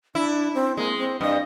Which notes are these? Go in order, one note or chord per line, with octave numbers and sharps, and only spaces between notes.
D4 E4
C4
G#3 A#3
C4
G2 D#5